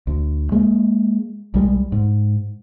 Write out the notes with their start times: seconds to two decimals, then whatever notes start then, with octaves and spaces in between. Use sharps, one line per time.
0.07 D2
0.52 G#3 A#3
1.54 B1 G3 G#3
1.92 G#2